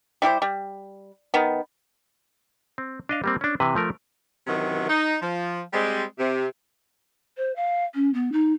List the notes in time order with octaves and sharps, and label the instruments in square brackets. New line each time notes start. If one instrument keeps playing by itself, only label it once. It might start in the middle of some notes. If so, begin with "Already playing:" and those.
[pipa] G3 E4 G4 C5
G3
D#3 B3
[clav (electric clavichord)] C4
D4 D#5 F5
G3 A#3 C4
C#4 D4
C3 E3 B4
F3 A3 A#4
[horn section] F#2 C3 D#3 E3 F#3
D#4
F3
G3 G#3 C4
C3
[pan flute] C5
F5
C#4
B3
D#4